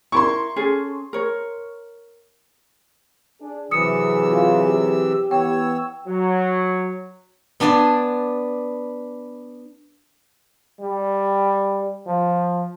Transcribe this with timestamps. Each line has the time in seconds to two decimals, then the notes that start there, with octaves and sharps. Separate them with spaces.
0.12 E4 A#4 C6 C#6
0.56 C#4 G#4 A4
1.13 A#4 C#5
3.41 D4 G#4
3.71 C3 E3 F#3 G#4 D#6 E6 C#7
4.33 F4
4.64 G4
5.31 E3 B3 C#5 G5 E6
6.07 F#3
7.60 B3 D4 G#5 A5 C6
10.81 G3
12.07 F3